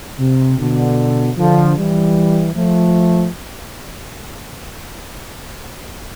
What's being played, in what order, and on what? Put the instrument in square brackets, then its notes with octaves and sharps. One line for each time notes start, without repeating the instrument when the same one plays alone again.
[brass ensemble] C3
B2 D3
D3 F3
E3 G3
F3 A3